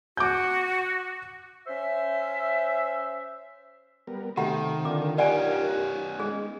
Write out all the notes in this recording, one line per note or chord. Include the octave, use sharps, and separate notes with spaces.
F#4 D6 G6
C#4 C5 E5
G3 B3 A#4
C3 D#3 A3 G4 F#5 A#5
D3 D#4 F4 A#4 D6
B3 C#4 G4 D5 F#5 G#5
G#3 D#4 G#4